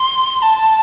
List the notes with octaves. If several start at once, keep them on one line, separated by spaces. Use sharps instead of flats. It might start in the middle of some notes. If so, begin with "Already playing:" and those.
Already playing: C6
A5